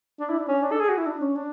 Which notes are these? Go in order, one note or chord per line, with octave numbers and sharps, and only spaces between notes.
D4
E4
D4
C#4
D4
A4
G#4
F#4
E4
D4
C#4
D4